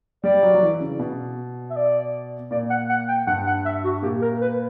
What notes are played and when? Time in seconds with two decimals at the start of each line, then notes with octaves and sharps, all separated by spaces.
0.24 G3 D5
0.43 F#3
0.55 F#3
0.63 E3
0.81 C#3
0.99 B2
1.70 E5
1.76 D5
2.51 A#2 D5
2.70 F#5
2.89 F#5
3.08 G5
3.27 G2 F#5
3.46 F#5
3.65 E5
3.84 F#4
4.02 A#2 G4
4.22 A#4
4.41 B4